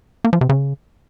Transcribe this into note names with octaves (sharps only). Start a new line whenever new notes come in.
A#3
F3
C3
C#3